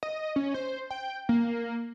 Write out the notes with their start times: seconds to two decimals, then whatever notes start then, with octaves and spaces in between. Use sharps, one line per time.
0.03 D#5
0.36 C#4
0.54 C5
0.90 G5
1.29 A#3